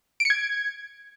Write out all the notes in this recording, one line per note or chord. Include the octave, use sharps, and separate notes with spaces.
D7
C#7
G#6